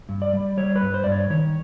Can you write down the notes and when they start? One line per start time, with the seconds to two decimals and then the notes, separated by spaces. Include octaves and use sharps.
0.09 G2
0.22 D5
0.33 G3
0.57 G3 C#5
0.76 B4
0.82 G2
0.94 C5
1.04 G2 D5
1.12 C#5
1.30 D#3 C#5